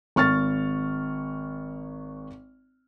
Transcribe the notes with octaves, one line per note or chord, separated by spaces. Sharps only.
G#1 C#6 F6 A6